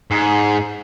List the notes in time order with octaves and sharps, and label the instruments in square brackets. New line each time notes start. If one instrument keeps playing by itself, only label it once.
[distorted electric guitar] G#2